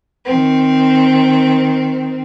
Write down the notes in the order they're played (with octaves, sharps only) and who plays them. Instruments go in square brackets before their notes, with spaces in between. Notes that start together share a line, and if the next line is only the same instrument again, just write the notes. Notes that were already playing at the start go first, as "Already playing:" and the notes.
[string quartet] D#3 C4